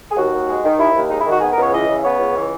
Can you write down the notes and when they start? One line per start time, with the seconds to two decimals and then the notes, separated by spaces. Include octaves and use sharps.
0.10 G#4
0.16 D#2 F#4
0.32 D#2
0.47 G#3
0.63 D#3
0.78 D#2 E4
0.95 D#2
1.09 G#3 D#4
1.20 E4
1.25 D#3 F#4
1.41 B3 G#4
1.52 A#4
1.57 C#2
1.62 C#5
1.72 E3 D#5
1.87 C#3
2.03 B3 C#5
2.19 C#2
2.35 E3